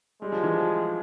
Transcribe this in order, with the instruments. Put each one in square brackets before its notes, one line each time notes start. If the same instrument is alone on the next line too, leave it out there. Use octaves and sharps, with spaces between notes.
[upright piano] G3 [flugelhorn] G#3
[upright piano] F3
E3
F3